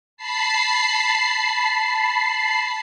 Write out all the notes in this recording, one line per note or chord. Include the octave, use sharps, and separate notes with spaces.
A5 B5 C7